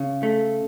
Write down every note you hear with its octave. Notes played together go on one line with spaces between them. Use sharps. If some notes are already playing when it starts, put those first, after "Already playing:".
Already playing: C#3
A3